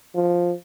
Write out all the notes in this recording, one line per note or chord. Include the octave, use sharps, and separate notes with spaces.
F3